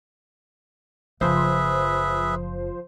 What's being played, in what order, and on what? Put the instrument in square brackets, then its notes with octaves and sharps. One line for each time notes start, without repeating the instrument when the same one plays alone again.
[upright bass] F#1 [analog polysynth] F3 C5 [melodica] G#4 B4 E5